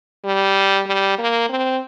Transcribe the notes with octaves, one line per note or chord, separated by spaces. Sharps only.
G3
G3
A#3
C4